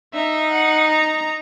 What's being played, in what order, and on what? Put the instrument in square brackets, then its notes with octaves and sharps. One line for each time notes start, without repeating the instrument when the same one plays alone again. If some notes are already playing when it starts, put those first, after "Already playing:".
[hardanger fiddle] D#4 [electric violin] E5
[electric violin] F#5
A#5